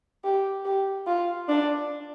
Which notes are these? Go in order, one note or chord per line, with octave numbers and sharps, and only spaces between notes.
G4
G4
F4
D4